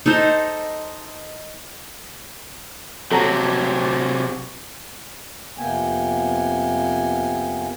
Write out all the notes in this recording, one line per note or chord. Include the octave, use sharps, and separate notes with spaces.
D#4 A4 C5
C3 F#3 A4 F#5 A#5
F2 C3 A#3 B3 G5 G#5